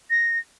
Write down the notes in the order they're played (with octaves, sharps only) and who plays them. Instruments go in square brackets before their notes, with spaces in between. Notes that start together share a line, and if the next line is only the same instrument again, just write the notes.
[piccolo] A#6